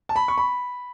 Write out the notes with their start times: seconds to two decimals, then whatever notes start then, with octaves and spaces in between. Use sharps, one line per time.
0.09 A5
0.16 B5
0.28 C#6
0.38 B5